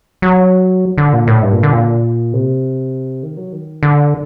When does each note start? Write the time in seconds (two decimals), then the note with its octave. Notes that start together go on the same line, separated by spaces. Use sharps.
0.22 F#3
0.98 D3
1.13 A#2
1.27 A2
1.43 G2
1.53 A#2
1.63 D3
1.73 A#2
2.33 C3
3.23 D#3
3.37 F#3
3.53 D#3
3.83 D3